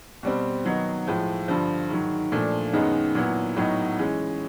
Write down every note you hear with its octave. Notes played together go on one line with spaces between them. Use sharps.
B2 G3 C4
D#3 F#3 B3 D#4
A2 F3 G#3
G2 D3 F3
G#2 D#3 F#3
A#2 F3 A3 D4
F#2 D#3 G#3 B3 D#4
A#2 F#3 B3 E4
A2 F#3 B3 D#4
E3 G#3 C#4